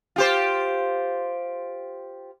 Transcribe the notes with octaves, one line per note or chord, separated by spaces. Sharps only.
F4 G4 C5